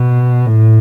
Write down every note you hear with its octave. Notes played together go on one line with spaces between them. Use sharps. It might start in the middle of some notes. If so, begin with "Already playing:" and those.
Already playing: B2
A2